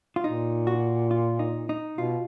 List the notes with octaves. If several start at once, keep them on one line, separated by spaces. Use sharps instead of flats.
F4
A#2 D#4
F#4
F4
D#4
D#4
B2 F4